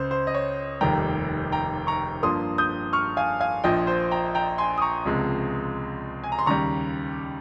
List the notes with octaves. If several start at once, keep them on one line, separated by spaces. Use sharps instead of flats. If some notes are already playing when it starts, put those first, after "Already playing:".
Already playing: C#2 C#3 C5
C5
D#5
C#5
F1 D#2 D#3 G3 G5 A#5
G5 A#5
A#5 C#6
G2 F3 A#3 C6 D#6
D#6 G6
C#6 F6
F5 G#5
F5 G#5
A#1 A#2 F3 D#5 G5
C5
G5 A#5
G5 A#5
G#5 C6
D#6
A#5 C#6
C#2 C3 F3 G#3
G#5
A#5
C6
D#2 C#3 G3 A#5 C#6